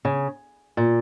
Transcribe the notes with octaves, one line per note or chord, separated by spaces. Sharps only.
C#3
A#2